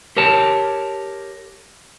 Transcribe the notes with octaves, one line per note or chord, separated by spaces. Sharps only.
G4 A#4 C#5 A5